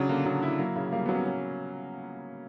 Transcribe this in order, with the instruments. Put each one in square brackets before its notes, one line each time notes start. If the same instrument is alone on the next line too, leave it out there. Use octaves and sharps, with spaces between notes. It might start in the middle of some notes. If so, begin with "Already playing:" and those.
Already playing: [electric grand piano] C#3 [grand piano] F#3 D4
[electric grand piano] D3 [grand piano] A#3
[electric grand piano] C#3 [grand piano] F#3
[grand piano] E4
[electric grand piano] F#3 [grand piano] A#3
[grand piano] C#3
[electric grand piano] G3 [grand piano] A#3
[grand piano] F#3 [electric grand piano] B3
[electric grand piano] C#4
C#4